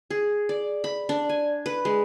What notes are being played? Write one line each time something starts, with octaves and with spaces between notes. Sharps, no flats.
G#4
D5
B5
D4
G#5
B4
G#3